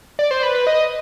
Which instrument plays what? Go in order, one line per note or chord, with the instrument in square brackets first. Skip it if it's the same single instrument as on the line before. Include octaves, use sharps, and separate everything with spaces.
[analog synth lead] D5
C5
B4
B4
D#5